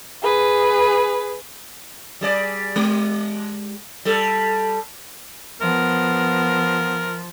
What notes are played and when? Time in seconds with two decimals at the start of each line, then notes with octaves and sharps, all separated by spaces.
0.23 G#4 B4
2.21 G3 G#4 D5
2.76 G#3 G4
4.05 G3 A4
5.61 F3 B3 A#4